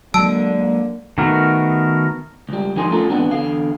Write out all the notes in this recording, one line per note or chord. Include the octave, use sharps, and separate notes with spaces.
D3 F#3 G#3 A#3 A5 E6
A#3
D#3 A3 B3 F#4 A#4
C#2 G3
G#2 F3 D#4 A#4 G#5 C6
A3 C#4 F4 A4 A#5
G#2 E3 B3 C4 D4 F#4
E2 D3 F5